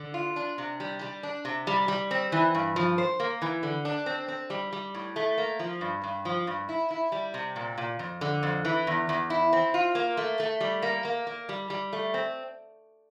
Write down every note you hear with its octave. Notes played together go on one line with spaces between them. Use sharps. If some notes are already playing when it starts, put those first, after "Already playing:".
Already playing: D3
F4
D4
C3
G3
G3
D4
C3
G3
G3
C4
E3
G2
F3
C5
A#3
E3
D3
D4
C4
C4
G3
G3
A2
A3
A#3
F3
G2
G2
F3
G2
E4
E4
G3
C3
A#2
A#2
F2
D3
F2
E3
E2
E2
E4
C4
F4
A#3
A3
A3
G3
A#3
A#3
A#3
G3
G3
A3
C4